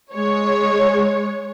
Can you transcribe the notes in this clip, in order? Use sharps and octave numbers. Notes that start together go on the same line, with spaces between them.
G#3 C#5